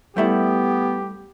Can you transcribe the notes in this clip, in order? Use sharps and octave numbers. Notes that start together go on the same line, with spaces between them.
G3 A3 B3 E4 G4